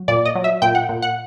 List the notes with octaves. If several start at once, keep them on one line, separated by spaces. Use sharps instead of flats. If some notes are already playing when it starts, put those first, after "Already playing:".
Already playing: F#3
A#2 D5
D#5
F#3
E5
A#2 G5
F#5
A#2
F#5